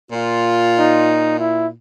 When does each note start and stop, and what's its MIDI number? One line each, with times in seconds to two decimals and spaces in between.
0.11 1.74 46
0.11 1.17 65
0.79 1.34 63
1.39 1.67 64